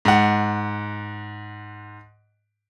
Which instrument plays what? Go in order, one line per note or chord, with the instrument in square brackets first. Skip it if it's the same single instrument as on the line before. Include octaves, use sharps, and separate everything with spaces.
[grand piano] G#2 F#5